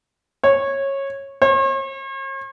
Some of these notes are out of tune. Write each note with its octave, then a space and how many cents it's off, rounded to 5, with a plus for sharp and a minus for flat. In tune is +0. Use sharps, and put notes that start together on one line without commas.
C#5 -15
C#5 -45